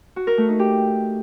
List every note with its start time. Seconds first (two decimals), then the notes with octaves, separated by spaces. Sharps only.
0.16 F#4
0.27 A#4
0.38 A3
0.49 D#4
0.59 G4